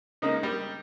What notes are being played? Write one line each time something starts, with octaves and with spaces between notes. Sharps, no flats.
C#3 G#3 A#3 D#4
G3